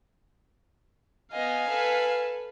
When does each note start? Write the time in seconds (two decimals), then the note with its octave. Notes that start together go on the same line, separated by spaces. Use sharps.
1.32 B3 D#5 F5 G#5
1.68 A4 B4